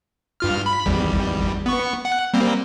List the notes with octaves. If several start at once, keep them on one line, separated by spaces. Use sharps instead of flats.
G2 F4 F6
B5
G#1 E2 G3
B3 C#6
F#5
G3 A#3 C4